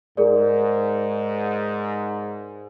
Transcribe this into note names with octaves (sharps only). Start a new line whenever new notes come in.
G#2 G#4 A#4 D5